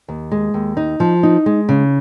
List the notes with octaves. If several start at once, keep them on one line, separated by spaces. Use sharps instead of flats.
D#2
G#3
D#2
D#4
F3
D#4
G#3
C#3